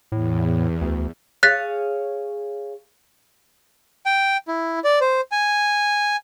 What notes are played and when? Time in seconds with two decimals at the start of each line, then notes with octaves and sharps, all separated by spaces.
0.12 E2 A2
0.81 D2
1.43 G#4 C#5 F5 F#6 A6 B6
4.06 G5
4.48 E4
4.84 D5
5.01 C5
5.32 G#5